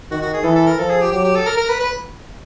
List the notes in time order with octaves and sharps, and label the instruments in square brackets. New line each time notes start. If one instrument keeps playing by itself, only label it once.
[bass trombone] D#3 [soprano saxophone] F#4
[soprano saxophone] F#4
G#4
[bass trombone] E3 [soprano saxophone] A4
[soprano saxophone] A4
A#4
[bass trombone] F3 [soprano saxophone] A4
[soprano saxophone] G#4
G4
[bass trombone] F#3 [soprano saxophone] G4
[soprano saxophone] G4
A4
A#4
A#4
B4
B4